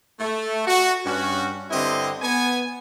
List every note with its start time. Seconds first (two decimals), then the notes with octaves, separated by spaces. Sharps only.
0.20 A3
0.67 F#4
1.06 G2 C#4 F#4
1.71 G2 D3 C4 E4 G4 D#5
2.22 B3 G#5